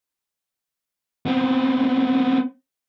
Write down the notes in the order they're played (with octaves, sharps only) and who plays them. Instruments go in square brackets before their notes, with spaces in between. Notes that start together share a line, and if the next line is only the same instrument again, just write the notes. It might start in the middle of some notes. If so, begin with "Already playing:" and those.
[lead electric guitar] B3 C4